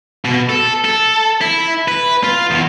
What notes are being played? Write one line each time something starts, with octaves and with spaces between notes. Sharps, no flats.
B2
A4
A4
E4
B4
F4
E2